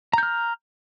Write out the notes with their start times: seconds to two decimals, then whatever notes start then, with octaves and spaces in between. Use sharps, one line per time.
0.13 A#5
0.18 G6
0.23 F6